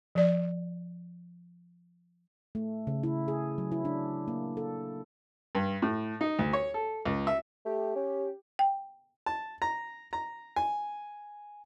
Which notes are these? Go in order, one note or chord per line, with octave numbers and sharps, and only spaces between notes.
F3 D5
A3
C#3
E4
G#4
F#3
E4
D4
A#3
A4
G2
A2
D#4
D2
C#5
A4
C#2
E5
A3 G4
C#4
G5
A5
A#5
A#5
G#5